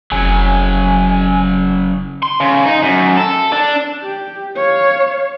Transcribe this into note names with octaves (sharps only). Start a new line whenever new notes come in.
F1 C#3 F#3 G#5
C6
C#3
D#4
F#2
A4
D4
G4
C#5 F5